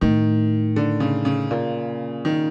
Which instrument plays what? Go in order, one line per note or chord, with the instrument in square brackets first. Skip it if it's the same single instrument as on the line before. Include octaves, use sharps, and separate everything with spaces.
[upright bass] A2 [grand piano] D#3
[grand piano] D3
C#3
C#3
[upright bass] A#2
[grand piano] D#3